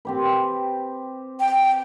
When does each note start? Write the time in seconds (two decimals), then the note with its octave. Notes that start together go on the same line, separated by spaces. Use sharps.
0.05 C4 G4 B4
1.40 G5